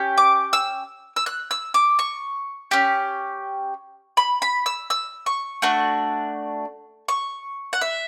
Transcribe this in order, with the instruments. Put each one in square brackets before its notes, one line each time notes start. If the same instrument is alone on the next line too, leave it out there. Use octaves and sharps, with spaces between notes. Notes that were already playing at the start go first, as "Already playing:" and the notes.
Already playing: [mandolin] C#4 G4
D6
E6
E6
F#6
E6
D6
C#6
C#4 G4
B5
B5
E6
E6
C#6
A3 D4 F#4
C#6
F#5
E5